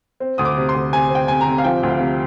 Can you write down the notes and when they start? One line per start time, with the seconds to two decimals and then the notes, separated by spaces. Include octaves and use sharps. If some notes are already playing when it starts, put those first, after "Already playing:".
0.20 C4
0.38 D2 D#6
0.45 D6
0.57 C3
0.69 C6
0.75 D2
0.93 C3 G#5
1.10 C4 G5
1.28 C3 G#5
1.41 A#5
1.47 C3
1.58 F5
1.64 F3 G5
1.83 D2
1.88 F5
2.00 C3